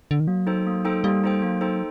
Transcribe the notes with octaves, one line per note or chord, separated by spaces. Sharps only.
D3
D#3
F#3 A#3
D#4 A4 C5 G5
A#3
D#4 A4 C5 G5
G3 A#3
D#4 A4 C5 G5
F#3 A#3
D#4 A4 C5 G5